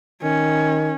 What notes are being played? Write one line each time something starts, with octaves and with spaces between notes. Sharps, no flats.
D#3 C#4